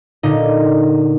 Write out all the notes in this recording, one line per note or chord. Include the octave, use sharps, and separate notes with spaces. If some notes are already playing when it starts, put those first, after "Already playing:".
A#2 D3 D#4